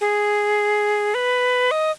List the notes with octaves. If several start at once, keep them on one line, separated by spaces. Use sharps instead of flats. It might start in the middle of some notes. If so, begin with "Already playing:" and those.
G#4
B4
D#5